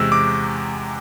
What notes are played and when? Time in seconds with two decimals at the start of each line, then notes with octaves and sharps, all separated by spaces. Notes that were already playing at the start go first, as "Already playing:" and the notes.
Already playing: E2 C3 G#3 E6
0.12 D6